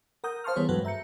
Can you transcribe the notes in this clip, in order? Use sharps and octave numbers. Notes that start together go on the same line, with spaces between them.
A#4 F#5 A#5 D#6 G6
C5 F5 A5 C6 C#6 F6
E3 G3 B3 G#4 C5 C#5
G2 F#3 G#3 F#4 A4 B4
E5 A#5 G6 C#7